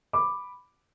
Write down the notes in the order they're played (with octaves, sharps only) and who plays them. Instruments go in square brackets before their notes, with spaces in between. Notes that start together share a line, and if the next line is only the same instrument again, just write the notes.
[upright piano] B5 D6